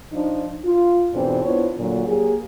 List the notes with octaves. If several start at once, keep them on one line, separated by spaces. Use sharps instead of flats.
F3 D4 D#4
F4
F2 G#2 B2 E3 C4 D4
B3 D4 E4 F4 C5 C#5
A#2 D3 F#3
F#3 A#3 G4 G#4